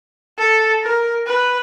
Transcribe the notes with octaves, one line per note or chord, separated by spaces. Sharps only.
A4
A#4
B4